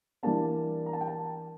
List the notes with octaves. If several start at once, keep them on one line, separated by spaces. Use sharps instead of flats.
E3 G3 A#3 D4 A5
A#5
A5
G5
A5